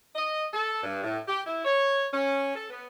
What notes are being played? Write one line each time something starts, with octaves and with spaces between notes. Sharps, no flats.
D#5
A4
G2
A2
G4
E4
C#5
C#4
A4
B3